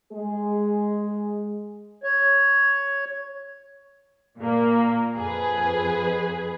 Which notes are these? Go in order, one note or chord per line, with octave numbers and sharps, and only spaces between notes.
G#3 G#4
C#5
A#2 A#3
F2 G#4 B4